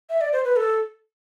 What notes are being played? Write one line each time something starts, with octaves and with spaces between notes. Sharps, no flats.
E5
D5
C5
B4
A4